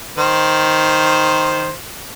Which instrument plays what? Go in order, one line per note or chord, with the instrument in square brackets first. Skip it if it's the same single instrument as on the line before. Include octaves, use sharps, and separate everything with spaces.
[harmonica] D#3 C5